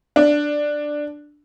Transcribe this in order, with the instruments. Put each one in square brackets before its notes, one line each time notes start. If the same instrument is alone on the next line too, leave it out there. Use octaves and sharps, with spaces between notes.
[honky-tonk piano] D4